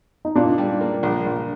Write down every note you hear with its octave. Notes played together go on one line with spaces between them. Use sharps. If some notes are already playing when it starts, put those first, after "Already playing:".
D#4
A#2 D4 F4
G3
A#3
A#1
A#1